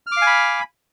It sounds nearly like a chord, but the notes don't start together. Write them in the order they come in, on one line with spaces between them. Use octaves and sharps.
F6 D6 F5 G#5 B5